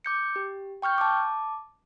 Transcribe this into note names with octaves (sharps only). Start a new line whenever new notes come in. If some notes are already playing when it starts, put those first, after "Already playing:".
D6 G6 C#7
G4
G5 C#6 F6 G6
A5 D6